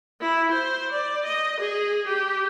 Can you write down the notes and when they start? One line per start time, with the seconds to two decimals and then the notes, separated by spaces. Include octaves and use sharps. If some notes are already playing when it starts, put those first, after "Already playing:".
0.21 E4
0.51 C5
0.92 D5
1.25 D#5
1.60 G#4
2.07 G4